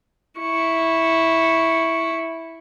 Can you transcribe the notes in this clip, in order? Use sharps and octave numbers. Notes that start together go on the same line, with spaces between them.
E4 C#6